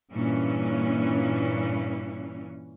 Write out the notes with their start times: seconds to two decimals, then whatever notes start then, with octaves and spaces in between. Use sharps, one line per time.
0.10 G2 A#2 E3 C#4